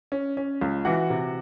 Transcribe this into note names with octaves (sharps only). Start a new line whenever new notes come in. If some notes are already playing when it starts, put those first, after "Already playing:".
C#4
C#4
C#2
E3 F#4 F#5
C3